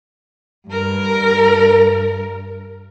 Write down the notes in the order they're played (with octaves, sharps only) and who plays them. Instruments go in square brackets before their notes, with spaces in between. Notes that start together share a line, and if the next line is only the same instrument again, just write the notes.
[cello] G2 A#4